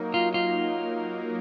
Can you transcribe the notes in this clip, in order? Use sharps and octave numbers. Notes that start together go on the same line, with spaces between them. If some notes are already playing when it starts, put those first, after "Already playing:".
Already playing: F#3 A#3 D#4 A#4
F4
F4